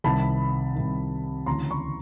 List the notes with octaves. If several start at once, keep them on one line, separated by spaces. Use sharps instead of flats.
C2 C3 D#3 A5 B5
C2 C3 D#3
D2 C#3 E3 A#5 C6
B5 C#6